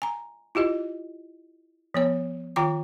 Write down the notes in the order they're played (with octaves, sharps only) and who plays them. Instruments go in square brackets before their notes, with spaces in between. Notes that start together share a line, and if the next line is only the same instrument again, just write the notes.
[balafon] G#5 A#5
E4 F4 G4 D#5
F3 B3 C#5
D#3 F4 G5 A#5 D6